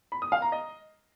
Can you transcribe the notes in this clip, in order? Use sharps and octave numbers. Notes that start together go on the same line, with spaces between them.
B5
D#6
F5
A#5
D#5